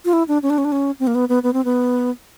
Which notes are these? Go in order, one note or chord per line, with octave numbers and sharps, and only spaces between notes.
F4
E4
D4
C#4
D4
C#4
D4
C#4
C4
A#3
B3
B3
B3
C4
B3